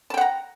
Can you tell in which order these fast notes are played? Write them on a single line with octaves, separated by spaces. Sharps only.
A5 G5 F#5 A#5